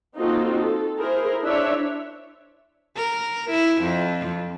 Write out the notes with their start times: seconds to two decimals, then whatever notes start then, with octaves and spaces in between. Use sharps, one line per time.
0.15 A#3 C4 D#4 F4 F#4 A4
0.57 A4
0.98 E4 G#4 A#4 C5
1.42 D4 E4 C5 C#5 E5
2.96 A#4
3.50 E4
3.82 F2